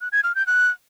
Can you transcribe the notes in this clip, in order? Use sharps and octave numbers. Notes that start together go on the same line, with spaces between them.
F#6
G#6
F6
G6
F#6